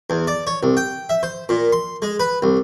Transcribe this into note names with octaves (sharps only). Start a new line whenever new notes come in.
E2
D5
C#5
C2
G5
E5
C5
A#2
C6
G#3
B4
C2